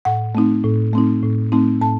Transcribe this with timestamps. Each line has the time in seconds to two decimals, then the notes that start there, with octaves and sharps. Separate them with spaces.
0.05 A2 F#5
0.35 A3 C4 D#4
0.64 A2
0.93 A3 C4 D#4
1.23 A2
1.52 A3 C4 D#4
1.81 A2 A5